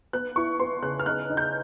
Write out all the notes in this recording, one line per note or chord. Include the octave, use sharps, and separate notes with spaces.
B3 F#6
E4 C#6
B3 C6
C#3 F#6
F6
D#4 F#6
D#4
G6